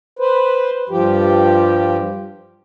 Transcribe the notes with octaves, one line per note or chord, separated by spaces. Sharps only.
B4 C5
G2 F3 G4